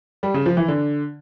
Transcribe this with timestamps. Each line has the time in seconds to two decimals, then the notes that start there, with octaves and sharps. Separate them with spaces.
0.23 G3
0.34 C#3
0.46 F3
0.57 E3
0.68 D3